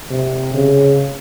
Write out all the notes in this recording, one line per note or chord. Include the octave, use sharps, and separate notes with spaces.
C3
C#3